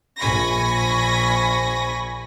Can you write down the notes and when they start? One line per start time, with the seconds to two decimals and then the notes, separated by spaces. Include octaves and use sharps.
0.20 A#1 G#5 B5 C#6 A#6